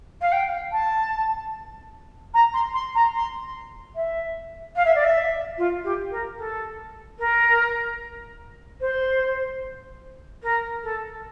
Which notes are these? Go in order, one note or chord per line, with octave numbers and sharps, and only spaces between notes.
F5
G5
A5
A#5
C6
C6
A#5
C6
E5
F5
E5
D5
E5
F4
G4
A#4
A4
A#4
C5
A#4
A4